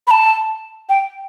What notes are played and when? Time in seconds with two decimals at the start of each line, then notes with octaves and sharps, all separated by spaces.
0.07 B5
0.11 A5
0.89 G5